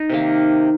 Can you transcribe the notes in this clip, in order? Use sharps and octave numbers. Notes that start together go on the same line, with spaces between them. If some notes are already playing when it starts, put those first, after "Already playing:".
Already playing: D#4
C3 D#3 A#3